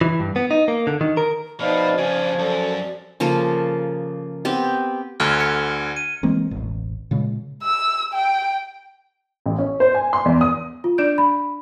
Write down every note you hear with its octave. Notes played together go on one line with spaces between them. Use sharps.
E3
G2
B3
D#4
A#3
D3
D#3
A#4
B2 F3 D#4 B4 D5 F5
G2 C#3 G#5
F#2 A4 D5
C#3 F3 A#3 A4
B3 C4 G4
D2 D3 F6 G#6 G7
C#7
D#7
E3 G#3 A#3 C4
E1 A1
A#2 C#3 G#3
E6
G5
A1
C#4
C5
G#5
C6
E2
D#6
F4
D4 D5 G6 D7
B5